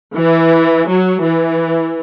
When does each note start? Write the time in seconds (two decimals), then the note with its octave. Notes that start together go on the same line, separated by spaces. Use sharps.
0.14 E3
0.86 F#3
1.23 E3